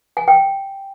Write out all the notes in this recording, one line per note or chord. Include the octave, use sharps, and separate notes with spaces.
G#5
G5